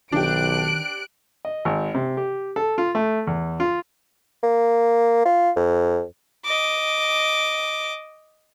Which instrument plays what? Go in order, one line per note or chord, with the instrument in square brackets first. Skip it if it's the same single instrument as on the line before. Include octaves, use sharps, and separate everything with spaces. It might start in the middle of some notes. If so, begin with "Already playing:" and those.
[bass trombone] B1 [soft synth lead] D#3 [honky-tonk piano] D4 G4 [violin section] F#6 D7
[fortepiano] D#5
G#1
C3
G4
A4
F4
A3
E2
F4
[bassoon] A#3
F4
F2
[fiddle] D#5 D6